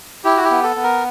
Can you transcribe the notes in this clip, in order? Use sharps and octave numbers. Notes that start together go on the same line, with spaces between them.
E4 G4
F#4
G4
B3
A4
B3
A#4